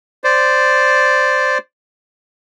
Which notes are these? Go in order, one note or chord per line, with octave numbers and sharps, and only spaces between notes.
C5 D5